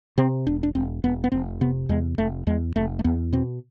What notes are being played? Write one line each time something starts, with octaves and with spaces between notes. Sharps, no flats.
C3 C4
E1 D4
D4
E1 C4
E1 B3
B3
F1 C4
C3 B3
E2 G#3
F1 A3
E2 G#3
F1 A3
A3
E2 B3
B2 C4